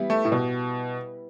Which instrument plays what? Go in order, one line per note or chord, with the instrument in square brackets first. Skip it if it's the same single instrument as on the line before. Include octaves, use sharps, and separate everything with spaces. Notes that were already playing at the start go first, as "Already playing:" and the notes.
Already playing: [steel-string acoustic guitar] G3 B3 E4 B4
[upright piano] A3
A2
B2